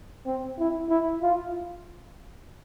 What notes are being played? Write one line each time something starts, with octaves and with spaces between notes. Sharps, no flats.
C4
E4
E4
F4